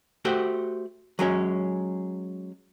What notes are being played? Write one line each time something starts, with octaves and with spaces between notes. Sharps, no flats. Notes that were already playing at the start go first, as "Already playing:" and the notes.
A3 F#4 G4 C5
F#3 G#3 C#4